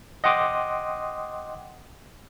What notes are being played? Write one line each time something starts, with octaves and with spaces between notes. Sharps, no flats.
D#5 F#5 G5 C6 D6 D#6